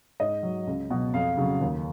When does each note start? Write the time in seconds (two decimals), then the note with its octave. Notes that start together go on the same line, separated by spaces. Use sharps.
0.20 G#2 D#5
0.43 F#3
0.67 C#2
0.90 B2 F#3
1.13 F2 F5
1.37 C#3 F#3
1.61 D#2